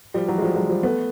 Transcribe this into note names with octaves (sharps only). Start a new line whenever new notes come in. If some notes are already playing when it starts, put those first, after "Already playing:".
F3 G3
E3 F#3
G#3
F3 G3
F#3 G#3
F3 G3
A3 B3